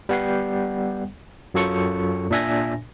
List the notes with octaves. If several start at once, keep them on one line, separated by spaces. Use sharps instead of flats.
G3 B3 F#5 G5 C7
F#2 F#3 F4 A4 C#6 C#7
A#2 D4 E5 G#5 A#6